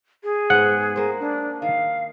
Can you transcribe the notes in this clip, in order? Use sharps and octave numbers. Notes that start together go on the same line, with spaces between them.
G#4
G#2 B3 F#5
A#3 C5
D4
D#3 F5